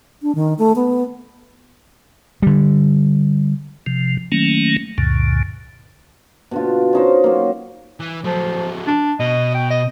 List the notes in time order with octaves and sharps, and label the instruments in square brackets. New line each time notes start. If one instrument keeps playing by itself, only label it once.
[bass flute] D4
D#3
A3
B3
[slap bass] D3 G3
[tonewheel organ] C3 F3
D#3 F#3 A3 A#3 C#4
C#2 F#2 A#2 D3
[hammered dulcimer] B2 D3 F4
C#4 D#4 C5
F#3 A#3
[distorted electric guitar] E3
[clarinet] F3 [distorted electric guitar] F#3 A3
[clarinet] D4
[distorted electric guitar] B2 [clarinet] D#5
[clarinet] G5
D#5